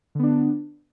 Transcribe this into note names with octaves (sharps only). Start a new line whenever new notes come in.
D3 B3 D4